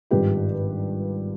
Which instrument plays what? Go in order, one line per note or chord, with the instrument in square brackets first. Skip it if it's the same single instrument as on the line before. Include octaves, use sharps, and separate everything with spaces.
[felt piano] G#1 G2 F3 G4 B4